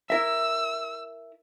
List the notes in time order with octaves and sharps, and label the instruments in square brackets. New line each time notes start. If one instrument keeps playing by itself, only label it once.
[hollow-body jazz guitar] E4 A#4 E5 [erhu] E6